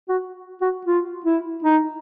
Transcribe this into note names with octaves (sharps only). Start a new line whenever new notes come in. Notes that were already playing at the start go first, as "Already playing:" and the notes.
F#4
F#4
F4
E4
D#4